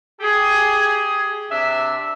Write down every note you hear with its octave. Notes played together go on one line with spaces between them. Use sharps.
G4 G#4
C3 D4 E5